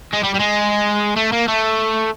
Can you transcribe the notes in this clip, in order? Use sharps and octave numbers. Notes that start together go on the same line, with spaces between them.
G#3
G3
G3
G#3
A3
A#3
A3